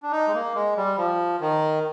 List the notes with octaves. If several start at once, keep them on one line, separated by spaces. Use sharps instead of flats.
D4
D#4
G#3
A#3
G#3
G3
F3
D#3